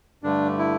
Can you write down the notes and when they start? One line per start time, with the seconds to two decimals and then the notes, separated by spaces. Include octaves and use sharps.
0.23 G2 D3 A3 D4
0.58 E4